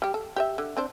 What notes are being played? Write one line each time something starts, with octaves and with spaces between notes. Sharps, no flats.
G3 G4
A4
G4 D5 E5
D3
C4 D4 C5